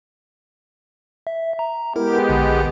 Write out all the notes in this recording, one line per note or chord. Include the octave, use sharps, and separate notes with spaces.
E5
A#5
G#3 B3 E4 G4 A#4
A#1 D3